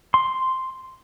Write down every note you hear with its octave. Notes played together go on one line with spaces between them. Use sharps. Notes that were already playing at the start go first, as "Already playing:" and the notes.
C6